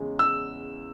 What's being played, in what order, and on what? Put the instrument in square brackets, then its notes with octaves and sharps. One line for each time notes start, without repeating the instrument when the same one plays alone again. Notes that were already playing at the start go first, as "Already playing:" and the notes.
Already playing: [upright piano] E2 C#3 G#3
[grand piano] E6